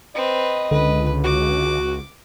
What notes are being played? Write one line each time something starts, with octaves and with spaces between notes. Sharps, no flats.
C4 B4 D#5
C#2 D3 B4
F#4 D6